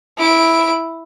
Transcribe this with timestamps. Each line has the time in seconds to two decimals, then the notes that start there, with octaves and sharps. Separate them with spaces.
0.18 E4 D7